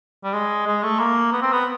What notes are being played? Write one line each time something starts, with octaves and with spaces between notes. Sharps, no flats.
G3
G#3
G#3
A3
A#3
B3
C4
B3